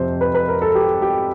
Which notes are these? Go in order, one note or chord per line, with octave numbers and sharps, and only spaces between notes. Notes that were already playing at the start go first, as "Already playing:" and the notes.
Already playing: F2 C3 F3 C5
B4
B4
A#4
A4
G4
G4